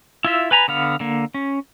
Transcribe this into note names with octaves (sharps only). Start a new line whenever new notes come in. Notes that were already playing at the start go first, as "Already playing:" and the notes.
E4 F4 E5
B4 G#5 A#5 B5
D3 B3 F5
D3 A#3
C#4